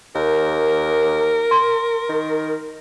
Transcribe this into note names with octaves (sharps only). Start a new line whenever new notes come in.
D#2 A#4
C6
D#3